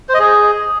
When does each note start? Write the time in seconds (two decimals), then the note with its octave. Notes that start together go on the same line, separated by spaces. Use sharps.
0.09 C5
0.14 D#5
0.19 G#4